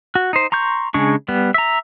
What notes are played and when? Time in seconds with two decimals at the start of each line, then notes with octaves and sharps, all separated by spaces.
0.15 F#4
0.33 D#4 C5
0.52 A#5 C6 C#6 G6
0.94 C#3 G#3 D4 C#6
1.28 G3 B3
1.54 E5 A#5